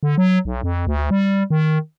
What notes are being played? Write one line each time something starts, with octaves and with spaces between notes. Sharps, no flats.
D3
F#3
B1
F2
D2
G3
D#3